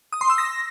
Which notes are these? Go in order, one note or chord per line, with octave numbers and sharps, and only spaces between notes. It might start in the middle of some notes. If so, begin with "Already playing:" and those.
D#6
C6
E6
A#6